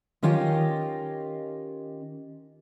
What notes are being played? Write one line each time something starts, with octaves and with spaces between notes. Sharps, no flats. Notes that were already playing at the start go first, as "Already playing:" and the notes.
D#3 C#4 F4 G4 D#5 G5